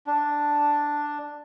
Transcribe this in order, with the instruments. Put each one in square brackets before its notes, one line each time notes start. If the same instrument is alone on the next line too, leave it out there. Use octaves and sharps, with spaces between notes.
[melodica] D4